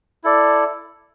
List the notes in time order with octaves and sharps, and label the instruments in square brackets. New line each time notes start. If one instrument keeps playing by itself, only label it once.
[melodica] E4 A4 D5